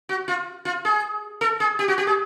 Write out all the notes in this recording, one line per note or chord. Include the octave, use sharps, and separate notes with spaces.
F#4
F4
F4
G#4
A4
G#4
G4
F#4
G4
G#4